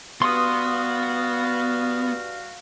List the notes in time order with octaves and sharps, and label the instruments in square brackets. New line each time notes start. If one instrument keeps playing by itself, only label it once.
[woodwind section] G2 F#4 F5 [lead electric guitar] B3 [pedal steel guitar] C6 D#6